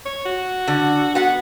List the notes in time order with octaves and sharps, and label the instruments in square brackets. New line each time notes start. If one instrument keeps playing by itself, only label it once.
[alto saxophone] C#5
F#4
[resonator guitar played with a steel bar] D3
[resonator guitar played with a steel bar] B3 F#5 [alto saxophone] F#4